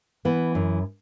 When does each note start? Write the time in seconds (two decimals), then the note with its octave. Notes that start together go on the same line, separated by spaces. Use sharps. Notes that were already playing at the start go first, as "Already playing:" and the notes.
0.25 E3 B3
0.55 F#2